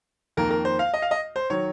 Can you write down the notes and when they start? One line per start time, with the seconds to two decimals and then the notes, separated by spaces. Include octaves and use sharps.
0.37 F2 D#3 A#3 A#4
0.51 A#4
0.65 C5
0.79 F5
0.94 D#5
1.02 F5
1.11 D#5
1.36 C5
1.50 D#3 F#3 C#5